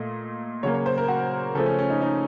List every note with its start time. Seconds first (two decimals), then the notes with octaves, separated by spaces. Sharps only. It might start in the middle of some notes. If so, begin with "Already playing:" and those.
Already playing: A#2 A3 D#5
0.63 C#3 F#3 A#3 C#5
0.74 C#5
0.86 C5
0.98 A#4
1.08 F#4
1.55 C#3 F3 A3 A4
1.66 C#4
1.79 C#4
1.90 D#4
2.02 D#4